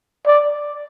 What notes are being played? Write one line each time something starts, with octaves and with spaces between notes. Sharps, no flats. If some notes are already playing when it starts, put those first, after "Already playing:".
D5